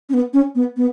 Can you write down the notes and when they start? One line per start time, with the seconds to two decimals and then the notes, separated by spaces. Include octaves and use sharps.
0.09 C#4
0.14 B3
0.34 C#4
0.55 B3
0.77 B3